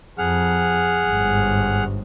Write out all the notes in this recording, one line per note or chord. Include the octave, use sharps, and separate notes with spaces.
F2 G#4 F#5 F6
G1 G#2